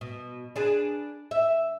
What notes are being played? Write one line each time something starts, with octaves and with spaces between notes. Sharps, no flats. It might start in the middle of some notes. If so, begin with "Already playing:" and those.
B2
D4 G#4 B4
E5